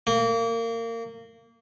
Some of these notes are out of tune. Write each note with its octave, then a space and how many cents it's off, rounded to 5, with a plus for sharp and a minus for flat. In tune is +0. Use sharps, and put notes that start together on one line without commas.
A#3 -25